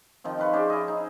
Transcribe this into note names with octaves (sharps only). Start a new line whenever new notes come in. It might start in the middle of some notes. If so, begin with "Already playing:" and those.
D#3 F3 C4
F4 B4 C#6
C#4 G#4 C5 D5
E4 D#5
D#4